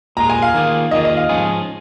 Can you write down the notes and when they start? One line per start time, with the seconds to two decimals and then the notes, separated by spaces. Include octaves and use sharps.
0.17 A#2 G#3 F4 A#5
0.30 G#5
0.42 F5
0.54 D#3 A#3 F4 G#4
0.91 D#3 A#3 F4 G#4 D#5
1.05 D#5
1.17 F5
1.29 G#2 F3 C#4 F4 G#4 G#5